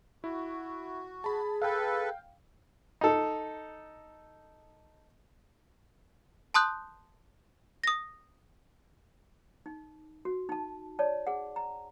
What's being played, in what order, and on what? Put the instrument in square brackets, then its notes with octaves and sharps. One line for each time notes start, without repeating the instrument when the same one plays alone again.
[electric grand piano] E4 [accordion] F#4
[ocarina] G#4 [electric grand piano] A5 B5
[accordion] A4 B4 [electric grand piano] F5 G5
[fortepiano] D#4 A4
[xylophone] A5 C6 D#6 F#6 G6
D#6 A#6
[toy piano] D#4
F#4
D#4 A5
C#5 D5 A5
G#4 F#5
A#5